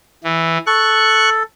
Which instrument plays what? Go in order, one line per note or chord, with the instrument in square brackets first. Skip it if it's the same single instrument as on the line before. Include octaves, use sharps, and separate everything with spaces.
[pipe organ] E3
[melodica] A4 [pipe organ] C#6 F#6